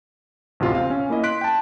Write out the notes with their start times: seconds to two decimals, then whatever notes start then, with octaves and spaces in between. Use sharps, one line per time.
0.60 A1 D2 C3 F4
0.74 C4 F5
0.90 C#4
1.10 A#3 E4 D#5
1.23 C6 F#6 B6 D7
1.41 G5 A5